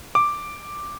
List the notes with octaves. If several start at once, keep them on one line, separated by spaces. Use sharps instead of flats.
D6